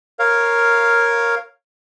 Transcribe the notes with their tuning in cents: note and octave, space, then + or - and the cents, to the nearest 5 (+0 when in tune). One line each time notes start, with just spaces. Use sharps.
A#4 +0 C#5 -10 F5 +0